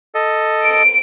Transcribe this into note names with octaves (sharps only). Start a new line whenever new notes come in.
A4 D#5
D7